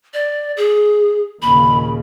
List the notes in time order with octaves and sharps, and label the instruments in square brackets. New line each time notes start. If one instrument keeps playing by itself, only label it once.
[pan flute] D5
G#4
[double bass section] D#2 A#2 C#3 [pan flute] B5